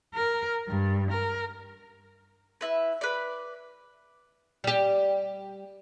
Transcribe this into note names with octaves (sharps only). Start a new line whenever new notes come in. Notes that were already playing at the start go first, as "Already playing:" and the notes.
A#4
G2
A#4
E4 B4
B4 D5
G3 G4